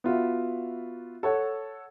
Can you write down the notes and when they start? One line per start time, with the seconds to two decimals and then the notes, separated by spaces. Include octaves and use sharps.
0.04 B3 F4 F#4 E5
1.23 A4 C#5 F#5